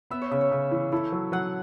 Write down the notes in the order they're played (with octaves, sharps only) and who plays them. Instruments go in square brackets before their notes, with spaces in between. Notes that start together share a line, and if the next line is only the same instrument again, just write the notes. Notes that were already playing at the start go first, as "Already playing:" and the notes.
[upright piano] B3 [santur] E5
[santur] C#5
[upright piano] C#3 [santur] E5
[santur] C#5
[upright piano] C#3
E3
[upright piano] E4 [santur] A4
[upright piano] F#3
[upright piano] F#3 [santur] F#5